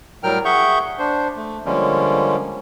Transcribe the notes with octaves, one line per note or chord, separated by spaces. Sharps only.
A2 F#3 G3 A#4 G5 F6
G#4 E5 F#5 C#6 G6
D4 C5
A3
D3 F3 G3 G#3 A#3 C#4